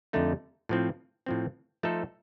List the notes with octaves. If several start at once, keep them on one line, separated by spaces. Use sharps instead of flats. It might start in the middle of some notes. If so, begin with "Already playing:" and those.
F2 D3 A3 D#4
A2 F3 C4
A2 F3 C4
F3 A3 D#4 A4 C5